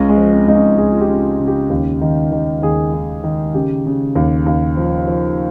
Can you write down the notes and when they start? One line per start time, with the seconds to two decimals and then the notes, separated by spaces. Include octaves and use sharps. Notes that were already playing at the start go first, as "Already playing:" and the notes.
Already playing: C#2 C#4
0.09 G#3
0.17 F3
0.33 C4
0.48 C#2 D#4
0.55 C#4
0.78 C#2 G#4
0.92 F4
1.01 G4
1.09 C#3
1.39 C#3
1.48 G4
1.70 D#2
2.01 D#3
2.32 D#3
2.62 D#2 G#4
2.94 D#3
3.24 D#3
3.54 C#3 G4
3.86 C#3
4.15 D#2
4.46 D#2
4.77 F3
5.08 F3